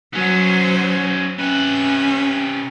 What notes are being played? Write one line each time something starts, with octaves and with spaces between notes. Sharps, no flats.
F#3 B3 C#4 C5
C3 C#4 B4